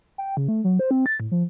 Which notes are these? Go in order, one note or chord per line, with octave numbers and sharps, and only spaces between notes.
G5
C#3
A3
F#3
C5
C4
A6
A2
F3